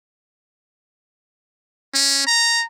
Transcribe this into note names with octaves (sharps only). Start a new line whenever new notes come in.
C#4
A#5